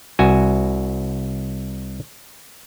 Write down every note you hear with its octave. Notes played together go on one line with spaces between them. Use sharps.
C2 F#4 E5 G#5